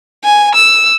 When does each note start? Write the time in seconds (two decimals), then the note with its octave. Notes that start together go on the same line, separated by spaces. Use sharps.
0.24 G#5
0.55 E6